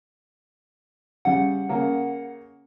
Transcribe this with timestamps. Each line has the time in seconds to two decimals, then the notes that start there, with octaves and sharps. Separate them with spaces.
1.25 C#3 G3 F#5
1.69 C#3 A#3 A#4